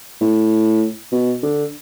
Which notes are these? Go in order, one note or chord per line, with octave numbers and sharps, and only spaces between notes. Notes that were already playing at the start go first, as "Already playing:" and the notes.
A2
B2
D3